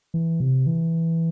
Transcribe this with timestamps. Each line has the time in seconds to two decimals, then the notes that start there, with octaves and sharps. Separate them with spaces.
0.14 E3
0.40 C3
0.66 E3